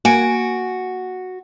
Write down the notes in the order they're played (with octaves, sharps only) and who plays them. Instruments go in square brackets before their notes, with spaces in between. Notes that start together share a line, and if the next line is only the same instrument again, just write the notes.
[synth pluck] A#3 G#5 D7 [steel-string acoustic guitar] F#4